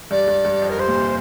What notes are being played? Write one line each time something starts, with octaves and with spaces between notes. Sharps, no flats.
G2 D5
G2
G2
F2
A#4
G2 C5
A#2
C3